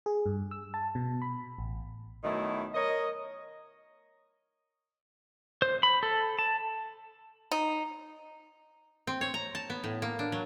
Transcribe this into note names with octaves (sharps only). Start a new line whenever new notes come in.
G#4
G2
E6
A5
B2
B5
A1
B2 D#3 F#3 A3 E4
A#4 C#5 D#5
C5
B5
A4
A5
D#4
C4
C#5
A#5
A5
B3
A2
A#3
D4
F#3